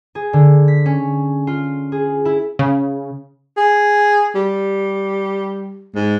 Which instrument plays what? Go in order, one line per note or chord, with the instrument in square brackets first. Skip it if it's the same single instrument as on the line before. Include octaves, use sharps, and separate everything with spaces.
[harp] G#4
D3
B6
C#4
F4
G#4
E4
[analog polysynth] C#3
[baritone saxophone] G#4
G3
G#2